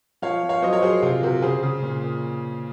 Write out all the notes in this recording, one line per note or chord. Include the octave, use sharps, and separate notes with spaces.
F3 C#5 F5
F3
C#5 F5
F#3 C5 D#5
A#4 C#5
F#3 G#4 C5
C3 F4 G#4
C3 F#4 A#4
C#3 G#4 C5
C#3
A#2
A#2